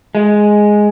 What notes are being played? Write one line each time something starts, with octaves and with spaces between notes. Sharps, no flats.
G#3